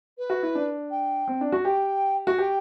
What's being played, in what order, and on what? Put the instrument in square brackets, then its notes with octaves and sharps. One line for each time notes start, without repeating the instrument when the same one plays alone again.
[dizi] B4
[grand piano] F#4
E4
D4
[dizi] G5
[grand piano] C4
D4
F#4
[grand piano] G4 [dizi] G5
[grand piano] F#4
[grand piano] G4 [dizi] G5